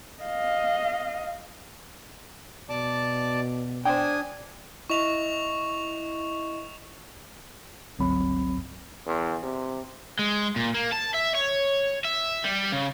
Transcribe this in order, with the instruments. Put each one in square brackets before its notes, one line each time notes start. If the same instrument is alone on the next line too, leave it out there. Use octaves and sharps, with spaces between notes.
[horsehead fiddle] D#5 F5
[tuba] B2 [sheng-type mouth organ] D5 A5 D6
[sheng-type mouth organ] D4 G#5 D#6 [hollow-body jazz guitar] C5 G5
[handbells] E4 D#5 E5 [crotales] C#6 F7
[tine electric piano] G1 C#2 F#3 C4 B5
[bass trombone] E2
C3
[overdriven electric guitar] G#3
A#2
A#3
A5
E5
C#5
E5
G3
C#3